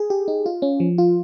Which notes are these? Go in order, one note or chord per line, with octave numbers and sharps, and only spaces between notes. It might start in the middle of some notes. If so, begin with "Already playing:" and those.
Already playing: G#4
G4
D#4
F4
C#4
F3
F4